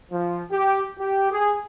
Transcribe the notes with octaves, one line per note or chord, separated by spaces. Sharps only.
F3
G4
G4
G#4